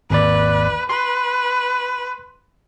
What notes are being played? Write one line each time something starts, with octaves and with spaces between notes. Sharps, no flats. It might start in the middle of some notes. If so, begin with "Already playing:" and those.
G#1 D#2 B4 D5
B4 C6